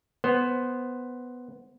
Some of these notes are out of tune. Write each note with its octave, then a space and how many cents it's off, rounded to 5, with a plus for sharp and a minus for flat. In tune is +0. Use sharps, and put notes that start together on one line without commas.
B3 +0 C5 +0